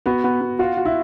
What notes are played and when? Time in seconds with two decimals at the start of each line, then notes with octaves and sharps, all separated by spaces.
0.06 B3 F#4
0.24 B3
0.41 B3
0.59 F4 F#4
0.77 F#4
0.85 E4